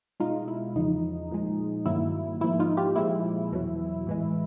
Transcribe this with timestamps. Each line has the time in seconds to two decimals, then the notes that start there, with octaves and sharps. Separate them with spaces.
0.20 B2 G#3 D#4 F4
0.48 E4
0.75 E2 C#3 F3 D#4
1.31 A#2 F3 G#3
1.85 G2 D#3 F#3 A#3 E4
2.41 G#2 F3 A#3 E4
2.59 D#4 F4
2.77 F4 G4
2.96 A#2 F3 G#3 E4
3.52 E2 B2 F#3
4.07 A2 E3 G#3